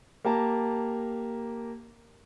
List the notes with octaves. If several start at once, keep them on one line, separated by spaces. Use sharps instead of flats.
A#3 G4 A5 A#5